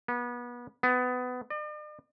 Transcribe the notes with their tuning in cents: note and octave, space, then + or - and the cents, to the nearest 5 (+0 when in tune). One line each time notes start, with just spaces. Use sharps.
B3 -30
B3 +20
D5 +45